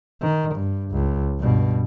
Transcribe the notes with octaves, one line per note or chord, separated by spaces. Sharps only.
D#3
G2
C#2
G2 B2